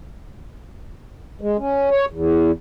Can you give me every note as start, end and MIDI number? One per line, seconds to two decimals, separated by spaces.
1.41 1.57 56
1.58 1.90 61
1.91 2.05 73
2.10 2.51 40